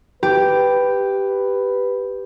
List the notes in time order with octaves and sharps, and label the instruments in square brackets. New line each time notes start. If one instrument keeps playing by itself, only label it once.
[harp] G4 [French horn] B4